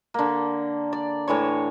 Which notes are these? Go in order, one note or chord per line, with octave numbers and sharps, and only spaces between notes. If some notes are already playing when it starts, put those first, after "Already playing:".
D3 A#3
D5
A2 D3 E3 C#5